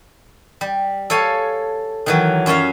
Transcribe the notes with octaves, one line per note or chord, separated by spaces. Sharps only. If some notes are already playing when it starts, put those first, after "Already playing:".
G3
A4 C#5 F5 G#5
D#3 E3 F#3
F#2 C#4 F4 E5 F5